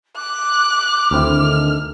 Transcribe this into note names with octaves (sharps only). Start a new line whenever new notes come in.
D6 F#6
D2 D3 D#3 C4 E4 F6